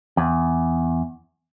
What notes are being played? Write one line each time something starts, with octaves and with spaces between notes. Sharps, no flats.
E2